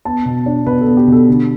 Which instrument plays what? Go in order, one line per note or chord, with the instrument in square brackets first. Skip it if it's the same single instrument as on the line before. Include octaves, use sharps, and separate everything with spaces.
[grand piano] B3 A5
B2
D4
B2 B4
A4
B3
G4
B2 A4
D3